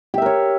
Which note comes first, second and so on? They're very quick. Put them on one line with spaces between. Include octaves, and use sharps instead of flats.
G4 E5 A#4 C#5